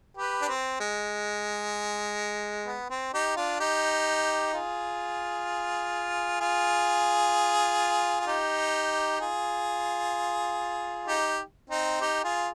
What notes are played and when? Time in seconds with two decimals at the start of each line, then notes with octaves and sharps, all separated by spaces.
0.17 G4 B4
0.42 D4
0.48 C4
0.80 G#3
2.66 B3
2.90 C4
3.13 D#4 G4
3.36 D4 F4
3.60 D#4 G4
4.53 F4 G#4
6.40 F4 G#4
8.20 G#4
8.27 D#4 G4
9.20 F4 G#4
11.07 D#4 G4
11.70 C4 D#4
12.01 D#4 G4
12.24 F4 G#4